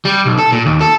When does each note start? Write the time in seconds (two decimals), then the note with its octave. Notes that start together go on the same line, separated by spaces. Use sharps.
0.05 G3
0.26 B1
0.38 A4
0.52 A#2
0.66 D#2
0.81 A4